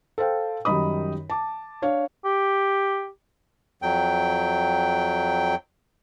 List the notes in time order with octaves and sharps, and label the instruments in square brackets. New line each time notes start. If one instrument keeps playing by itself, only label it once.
[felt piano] A4 C5 F5 G5
F#2 D#3 G3 D#4 B5 D#6
A5 D6
D4 C#5 F5
[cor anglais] G4
[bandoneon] F2 F#3 G5